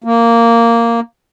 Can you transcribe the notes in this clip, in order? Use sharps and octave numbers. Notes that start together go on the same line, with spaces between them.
A#3